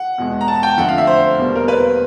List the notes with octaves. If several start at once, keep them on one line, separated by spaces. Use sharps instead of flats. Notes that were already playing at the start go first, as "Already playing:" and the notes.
Already playing: F#5
E2 B2 G#3
A#5
A5
G5
F2 D3 F3 A3 F#5
F5
E5
C5
E2 B2 G3 A#3
A#4
B4